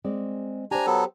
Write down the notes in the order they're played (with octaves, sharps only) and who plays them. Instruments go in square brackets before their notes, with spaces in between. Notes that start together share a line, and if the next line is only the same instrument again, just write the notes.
[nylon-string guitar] G#3 C4 D5
[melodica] D4 G#5 A#5 [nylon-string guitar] G4 C5
[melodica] F#3 B3 A4